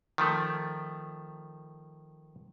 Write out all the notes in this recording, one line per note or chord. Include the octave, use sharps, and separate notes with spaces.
D#3 F3 A3